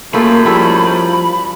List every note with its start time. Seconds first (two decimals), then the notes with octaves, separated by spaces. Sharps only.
0.14 F#2 A3 A#3 F4 G#4 B5
0.46 F3 G3 A3 E4